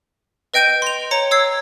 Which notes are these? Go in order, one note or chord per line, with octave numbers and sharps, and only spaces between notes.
B4 D#5 G5 G6 D7 D#7
C6 F7
C#5 A#5 C#7
C#5 E6 G#6 C7